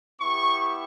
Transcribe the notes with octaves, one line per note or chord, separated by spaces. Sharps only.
B3 E4 G4 C#6